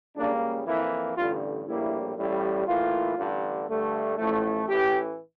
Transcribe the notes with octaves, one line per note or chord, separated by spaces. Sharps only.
C#2 C#3 G3 A#3 D4
F2 E3 A#3 E4
A1 G2 D3 F4
A#1 A2 G3 A#3 E4
A1 A2 G3
A2 E3 A#3 F4
A1 G2 D3
G2 D3 A3
A1 A2 F3 A3
A1 A2 E3 G4